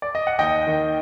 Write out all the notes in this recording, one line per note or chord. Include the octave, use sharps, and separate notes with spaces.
D5
D#5
F#5
D#2 D#5 G5
D#3